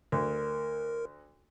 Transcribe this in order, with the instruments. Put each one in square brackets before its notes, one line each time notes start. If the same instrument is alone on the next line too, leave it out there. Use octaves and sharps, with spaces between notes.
[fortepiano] D2 [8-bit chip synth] A#4